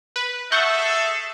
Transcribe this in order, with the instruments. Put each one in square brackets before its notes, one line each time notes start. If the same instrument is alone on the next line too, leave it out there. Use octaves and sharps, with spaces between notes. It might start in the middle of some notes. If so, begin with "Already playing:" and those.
[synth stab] B4
[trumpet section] G#4 A4 [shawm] E5 [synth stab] F#5 C#6 G6